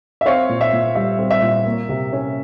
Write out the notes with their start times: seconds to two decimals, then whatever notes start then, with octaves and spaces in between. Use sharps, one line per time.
0.21 E5
0.26 C4 C#5 F5
0.49 A#2
0.61 E5
0.73 A#2
0.95 G3 E5
1.19 C4
1.31 E5
1.42 A#2
1.66 A#3
1.89 C3
2.13 C#4